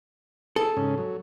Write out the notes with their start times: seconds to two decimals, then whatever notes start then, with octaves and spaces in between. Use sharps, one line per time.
0.56 G#4 A4
0.77 G#2 C#3 C#4
0.98 F#3